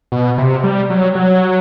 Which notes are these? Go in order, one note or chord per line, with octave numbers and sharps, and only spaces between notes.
B2
C3
G3
F#3
F#3